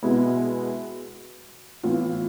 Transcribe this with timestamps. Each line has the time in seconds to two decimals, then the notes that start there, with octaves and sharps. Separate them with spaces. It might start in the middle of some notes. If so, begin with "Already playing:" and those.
0.03 B2 G#3 B3 E4
1.84 A2 E3 B3 F4